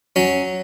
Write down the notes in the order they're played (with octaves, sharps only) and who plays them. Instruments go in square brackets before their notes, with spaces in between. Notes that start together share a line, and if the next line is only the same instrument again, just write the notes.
[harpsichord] F#3 C#4